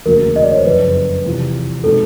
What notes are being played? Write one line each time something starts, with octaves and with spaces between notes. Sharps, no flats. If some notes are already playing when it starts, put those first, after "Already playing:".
E1 D2 C#3 F#3 A#3 A#4
D#5
D5
C#5
C5
F#1 F2 C#3 B4
E2 C3 F3
B2 G#3 C4 D#4 A4